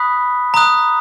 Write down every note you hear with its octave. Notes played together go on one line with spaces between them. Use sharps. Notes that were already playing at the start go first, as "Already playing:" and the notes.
Already playing: B5 D#6 F#6 B6
A#5 D#6 F#6